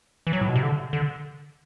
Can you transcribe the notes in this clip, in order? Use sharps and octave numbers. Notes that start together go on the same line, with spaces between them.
E3
F#3
A2
B2
C3
D3
D3